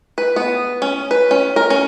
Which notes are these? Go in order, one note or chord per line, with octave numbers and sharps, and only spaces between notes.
B4
B3
C#4
B4
C#4
A#4
C#4